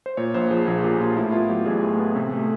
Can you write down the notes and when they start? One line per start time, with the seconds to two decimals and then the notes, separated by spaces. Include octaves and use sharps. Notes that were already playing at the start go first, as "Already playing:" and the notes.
0.06 C5
0.17 A#2 C#5
0.34 A#1 C5
0.51 F3 G#4
0.67 A#1 G#4
0.84 A#2 G4
1.00 A#1 F4
1.17 A2 E4
1.32 B3 F4
1.50 F#3 G4
1.66 A1 G#4
1.82 A2
1.99 B3
2.15 C3
2.31 A3